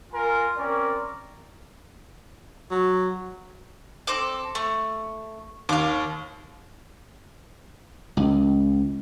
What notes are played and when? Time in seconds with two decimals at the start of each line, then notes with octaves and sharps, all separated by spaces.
0.13 F4 A#4 G#5
0.57 C4 C#4 A#4 D5
2.71 F#3
4.07 C4 A4 D6
4.55 A3
5.69 D#2 F5 D6
8.17 C#2